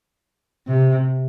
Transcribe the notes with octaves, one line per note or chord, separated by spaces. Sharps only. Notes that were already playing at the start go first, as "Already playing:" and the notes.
C3